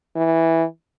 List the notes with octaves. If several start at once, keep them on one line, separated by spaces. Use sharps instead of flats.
E3